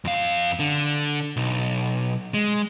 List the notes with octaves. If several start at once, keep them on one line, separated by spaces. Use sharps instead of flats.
F2 F5
D3
B1
G#3